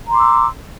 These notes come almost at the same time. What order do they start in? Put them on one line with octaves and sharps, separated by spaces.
A#5 C6 D6 E6